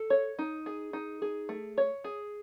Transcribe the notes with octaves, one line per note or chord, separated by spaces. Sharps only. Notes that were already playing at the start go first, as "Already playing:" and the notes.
Already playing: A4
C#5
D#4
G#4
D#4
G#4
A3
C#5
G#4